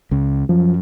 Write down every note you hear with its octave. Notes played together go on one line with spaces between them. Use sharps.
C#2 C#3
F#2 F3